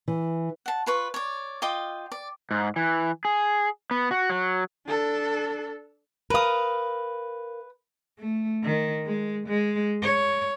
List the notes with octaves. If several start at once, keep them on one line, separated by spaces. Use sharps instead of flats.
E3
F#5 A5
F4 B4 C#6
C#5 D5
F4 D#5 G5 D6
D5
G#2
E3
G#4
B3
F#4
F#3
D4 A4
A#4 B4 F5 D#6
A3
D#3
G#3
G#3
C#5